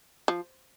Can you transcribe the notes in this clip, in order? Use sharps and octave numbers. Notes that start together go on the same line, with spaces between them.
F3